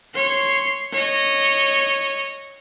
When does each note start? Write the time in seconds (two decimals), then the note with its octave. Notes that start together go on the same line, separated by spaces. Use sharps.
0.14 C#5 C6
0.92 C#5 D#5